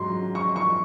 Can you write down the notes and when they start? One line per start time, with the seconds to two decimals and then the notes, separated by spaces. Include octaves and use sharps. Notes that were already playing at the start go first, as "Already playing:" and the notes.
Already playing: G#2 F#3 C6
0.35 C#6
0.56 C#6